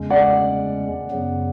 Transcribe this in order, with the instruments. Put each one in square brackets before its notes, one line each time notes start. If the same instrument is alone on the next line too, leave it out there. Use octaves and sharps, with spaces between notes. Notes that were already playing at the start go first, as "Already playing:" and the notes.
Already playing: [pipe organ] E2 C#3 G#3 C#4
[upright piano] D5 F#5
[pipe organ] F#2 C#3 F#3 B3